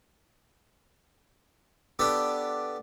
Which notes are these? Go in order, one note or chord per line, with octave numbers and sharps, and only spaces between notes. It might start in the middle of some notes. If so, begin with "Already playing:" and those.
B3 D4 G4 A4